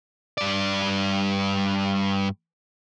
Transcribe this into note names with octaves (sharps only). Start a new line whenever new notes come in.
G2 D5